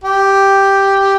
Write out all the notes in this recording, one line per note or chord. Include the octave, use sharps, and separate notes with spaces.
G4